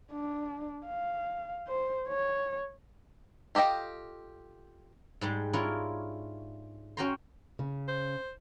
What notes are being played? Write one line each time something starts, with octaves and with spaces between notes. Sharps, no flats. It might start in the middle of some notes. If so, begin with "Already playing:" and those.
D4
F5
C5
C#5
F4 G4 A4 D#5 G5
G#2 G3 G#3
D4 E4 F4 A#4 C#5
C#4 F#4 G5 A#5 C6
C#3
C5